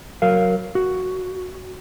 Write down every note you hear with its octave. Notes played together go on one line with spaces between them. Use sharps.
F#3 A#4 F5
F#4